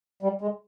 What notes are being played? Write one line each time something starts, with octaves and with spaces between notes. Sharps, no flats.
G3
G#3